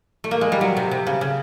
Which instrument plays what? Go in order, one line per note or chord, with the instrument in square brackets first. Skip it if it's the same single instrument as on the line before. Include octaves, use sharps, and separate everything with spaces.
[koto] A3
A#3
G#3
G3
F#3
C3
C3
C#3
C#3